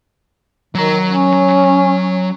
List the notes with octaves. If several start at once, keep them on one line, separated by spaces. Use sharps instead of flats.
D#3 F#3 A#5
C#4